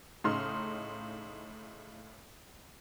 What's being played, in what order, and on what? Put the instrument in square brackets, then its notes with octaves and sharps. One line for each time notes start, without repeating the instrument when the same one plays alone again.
[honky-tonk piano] A2 C#3 D#4 C6 F6